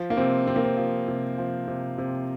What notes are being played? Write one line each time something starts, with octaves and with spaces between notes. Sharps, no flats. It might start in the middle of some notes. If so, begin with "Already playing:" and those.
Already playing: F3
A#3
C3 C4
C3 C4
A#3
C4
F3
C3
F3
C3
C3